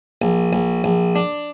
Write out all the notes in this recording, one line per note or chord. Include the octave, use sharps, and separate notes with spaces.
A#1
A#1
A#1
D4